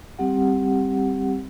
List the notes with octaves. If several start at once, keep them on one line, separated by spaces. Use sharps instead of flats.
G3 C4 G4 F#5